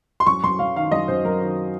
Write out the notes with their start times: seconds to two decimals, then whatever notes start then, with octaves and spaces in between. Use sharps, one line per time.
0.20 C6
0.27 F#2 C#6
0.43 F#2 C6
0.59 F#3 F5
0.76 D#3 F5
0.92 F#2 D#5
1.08 F#2 C5
1.24 F#3 A#4
1.40 D#3